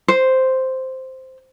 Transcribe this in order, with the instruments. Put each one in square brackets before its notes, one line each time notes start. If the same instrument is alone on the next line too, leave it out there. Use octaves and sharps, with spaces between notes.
[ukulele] C5